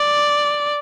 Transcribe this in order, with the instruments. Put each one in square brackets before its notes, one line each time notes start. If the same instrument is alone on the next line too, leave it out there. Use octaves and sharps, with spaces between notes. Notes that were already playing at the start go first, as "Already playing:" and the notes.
Already playing: [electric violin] D5